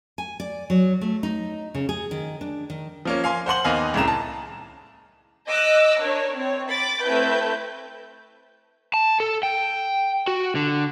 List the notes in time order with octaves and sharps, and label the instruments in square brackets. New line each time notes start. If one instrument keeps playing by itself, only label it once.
[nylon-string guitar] G#5
D5
F#3
A3
D#4
C#3
G#4
D#3
D4
D#3
[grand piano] F3 A#3 C#4
F5 G#5 C6
C5 F#5 C6 F#7
D#2 A#3 B3 D#4 F5 G#5
C2 A2 C#3 A#5 E7
A5
[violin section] D#5 D6 E6 F#6
D4 A#4 C#5
C4 C#5
B5 D6 A6
A3 C4 E4 B4 G6
[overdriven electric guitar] A5
A4
G5
F#4
D3